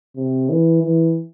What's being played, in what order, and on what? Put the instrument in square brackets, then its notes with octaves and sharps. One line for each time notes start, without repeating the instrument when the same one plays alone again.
[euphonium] C3
E3
E3